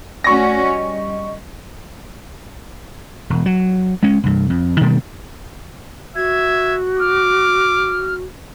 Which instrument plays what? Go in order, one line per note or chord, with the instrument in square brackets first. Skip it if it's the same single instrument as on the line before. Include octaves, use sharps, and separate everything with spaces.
[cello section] A3 C#4 F#4 [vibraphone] D5 F#5 [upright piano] C#6 A#6
[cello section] G3 [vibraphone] D#5
[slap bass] E1
F#3
G#3 C#4
C2 G2
F2
B2 D#3 G3 A#3
[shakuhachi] F#4 [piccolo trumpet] E5 [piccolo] G#6
[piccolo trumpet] D6 [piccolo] F6